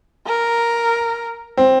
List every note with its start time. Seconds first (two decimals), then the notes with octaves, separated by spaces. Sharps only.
0.27 A#4
1.57 C4